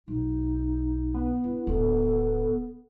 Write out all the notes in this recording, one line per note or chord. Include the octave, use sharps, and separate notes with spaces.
B1 D#4
B3
D4 E4
D1 D4 A4